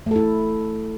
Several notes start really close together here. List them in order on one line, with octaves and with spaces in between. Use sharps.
A3 A4 E4